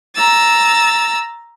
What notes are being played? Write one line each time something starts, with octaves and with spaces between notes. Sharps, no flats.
A#5 E6 A6